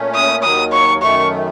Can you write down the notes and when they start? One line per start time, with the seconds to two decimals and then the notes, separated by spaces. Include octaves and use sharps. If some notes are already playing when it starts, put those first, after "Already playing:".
Already playing: A#2 A3 C#4
0.15 D#6
0.43 D#2 D#3 F#3 D#6
0.72 C#6
1.02 F#2 D#3 A3 C#6